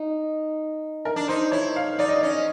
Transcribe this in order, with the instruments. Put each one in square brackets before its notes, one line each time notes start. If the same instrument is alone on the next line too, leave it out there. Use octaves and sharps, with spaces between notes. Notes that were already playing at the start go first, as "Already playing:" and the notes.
Already playing: [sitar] D#4
[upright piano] A#4
[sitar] D4
[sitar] D#4 [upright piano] C5
[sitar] E4 [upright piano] C#5
[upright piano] F5
[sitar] D#4 [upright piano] D5
[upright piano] D#5
D5
[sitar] C#4